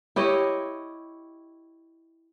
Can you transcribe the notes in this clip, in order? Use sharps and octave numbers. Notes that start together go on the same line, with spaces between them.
E4 G4 C#5 D#5